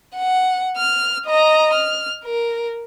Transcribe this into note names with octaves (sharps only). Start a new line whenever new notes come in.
F#5
F6
D#5 A#5
F6
A#4